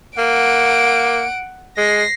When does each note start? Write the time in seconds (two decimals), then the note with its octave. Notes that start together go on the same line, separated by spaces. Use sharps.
0.18 A#3 F#5 D7
1.78 G#3 A#6 C7